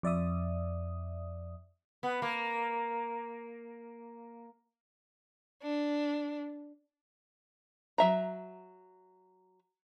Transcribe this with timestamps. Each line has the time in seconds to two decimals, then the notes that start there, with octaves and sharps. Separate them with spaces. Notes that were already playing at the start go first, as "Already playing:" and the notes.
0.03 F2 D5 E5 D#6
2.03 B3
2.22 A#3
5.62 D4
7.98 F#3 E5 A#5